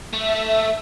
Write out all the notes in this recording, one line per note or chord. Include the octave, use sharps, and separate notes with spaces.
A3 E5